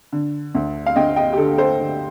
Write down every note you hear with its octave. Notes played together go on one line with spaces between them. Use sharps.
D3
D2
F5
D2 D#5 G5
D#5 G5
G4
D3 A4
A4 C5
D3